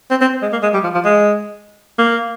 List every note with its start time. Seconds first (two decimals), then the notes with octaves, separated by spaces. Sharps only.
0.11 C4
0.21 C4
0.42 G#3
0.53 A#3
0.63 G#3
0.73 G3
0.84 F3
0.94 F3
1.05 G#3
1.98 A#3